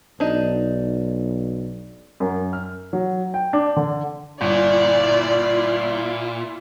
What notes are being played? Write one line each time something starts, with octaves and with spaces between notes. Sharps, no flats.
B1 D4 D#4
F#2
F6
F#3
G5
D4
D3
G1 A#2 E4 F4 D5